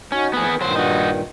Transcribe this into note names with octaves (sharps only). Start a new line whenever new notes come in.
C#4 D#4 F#4
G#2 F3 A3 B3 G#4
D#3 E3
G2 A#2 D#3 F#3 C5
D#4 F#4